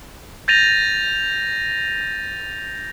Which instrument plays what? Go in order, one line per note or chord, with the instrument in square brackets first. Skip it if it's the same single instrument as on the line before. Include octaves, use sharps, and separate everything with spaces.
[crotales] G6 A6 A#6 D#7 F7